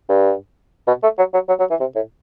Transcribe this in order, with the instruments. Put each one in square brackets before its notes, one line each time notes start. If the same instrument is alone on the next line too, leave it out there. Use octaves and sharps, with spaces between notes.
[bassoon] G2
B2
A3
F#3
F#3
F#3
F#3
E3
C3
A2